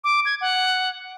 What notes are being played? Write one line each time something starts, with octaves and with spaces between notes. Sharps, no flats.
D6
G#6
F#5